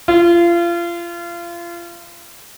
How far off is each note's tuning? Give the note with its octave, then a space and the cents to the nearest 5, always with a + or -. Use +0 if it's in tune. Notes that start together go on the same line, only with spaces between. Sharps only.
F4 -30